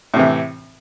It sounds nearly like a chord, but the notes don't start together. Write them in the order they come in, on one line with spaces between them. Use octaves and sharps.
A2 C3 E3